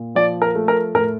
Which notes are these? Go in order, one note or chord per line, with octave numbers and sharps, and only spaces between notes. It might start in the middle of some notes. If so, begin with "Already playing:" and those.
Already playing: A#2
F3 D5
A#4
A3
A#4
A2 A#4